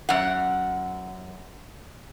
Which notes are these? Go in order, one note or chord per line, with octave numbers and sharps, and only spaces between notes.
F#2 F#5